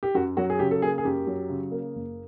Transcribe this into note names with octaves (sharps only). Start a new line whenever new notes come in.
G4
F#2 F#4
F#3 F#4
G#4
C#3 G4
A4
A#3 G#4
G#4
F#2 G4
F#3
C#3
A#3
F#1